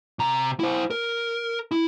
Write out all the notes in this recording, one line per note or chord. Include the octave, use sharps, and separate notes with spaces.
C3 A#5
E4 C5
A#4
E4